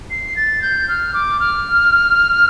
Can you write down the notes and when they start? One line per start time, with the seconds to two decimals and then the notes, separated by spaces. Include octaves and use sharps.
0.10 C7
0.36 A6
0.62 G6
0.88 F6
1.14 D6
1.40 F6